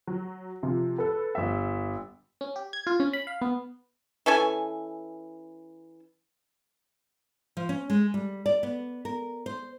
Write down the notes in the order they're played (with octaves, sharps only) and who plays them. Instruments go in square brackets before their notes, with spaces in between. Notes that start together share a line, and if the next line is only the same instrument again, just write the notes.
[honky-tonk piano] F#3
C3 F3
A4 B4
G1 E5
[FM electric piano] C#4
G4
G#6
F4
C#4
B5
F5
B3
[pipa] E3 C#4 A4 G#5
[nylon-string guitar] F3
C#4
G#3
G3
D5
B3
A#4
C5